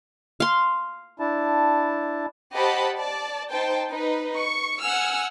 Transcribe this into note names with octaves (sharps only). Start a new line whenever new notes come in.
F5 C6
D4 E4 A5
G4 C5 D#5 F#5 A5 B5
D5 A5
D#4 C5 G5 A5
D#4 B4
C#6
F#5 G#5 E6 F6